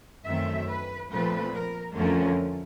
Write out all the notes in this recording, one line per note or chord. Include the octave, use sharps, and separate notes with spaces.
F#2 D#3 F#3 A3 C4 E5
B4
A#2 F3 A3 C4 B4
A#4
F2 D3 F3 A3 C#4 A#4